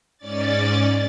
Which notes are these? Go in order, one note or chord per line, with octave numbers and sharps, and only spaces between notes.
G#2 C#4 D5 A6